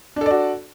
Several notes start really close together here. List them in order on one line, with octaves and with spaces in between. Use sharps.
D4 A4 D5 F#4